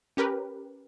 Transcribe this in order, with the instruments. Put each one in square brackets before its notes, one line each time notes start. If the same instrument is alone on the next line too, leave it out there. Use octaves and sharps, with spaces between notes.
[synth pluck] C#4 G4 A#4 B4